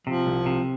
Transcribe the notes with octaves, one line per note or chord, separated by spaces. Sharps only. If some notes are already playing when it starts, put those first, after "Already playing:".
C3 F3
C2
C3